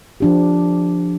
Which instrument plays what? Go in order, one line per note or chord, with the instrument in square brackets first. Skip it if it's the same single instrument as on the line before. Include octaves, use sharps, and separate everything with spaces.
[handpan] F3 D4 G4